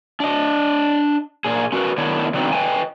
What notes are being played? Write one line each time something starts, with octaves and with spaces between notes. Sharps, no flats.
D4 D#5
A#2 G#4
C#4 F#4 G#4 A#4 B4
D#3 B3 D4 E4 C#5
D3 F#3 B3 C4 D#4
B4 D#5 G5 G#5